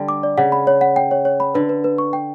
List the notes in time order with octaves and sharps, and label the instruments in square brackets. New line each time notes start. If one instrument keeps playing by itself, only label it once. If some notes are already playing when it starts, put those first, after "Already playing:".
Already playing: [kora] D3 G3 [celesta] D5 G5
[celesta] D6
D5
[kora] C#3 [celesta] F#5
[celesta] B5
C#5
F#5
G5
C#5
C#5
B5
[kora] D3 [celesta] B4
[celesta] B4
B4
C#6
G5